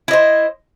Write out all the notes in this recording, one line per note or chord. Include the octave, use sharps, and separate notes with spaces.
E4 C5 D#5